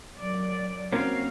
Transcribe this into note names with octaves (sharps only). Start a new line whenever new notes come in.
F#2 D5
A#3 C4 C#4 F#4 F5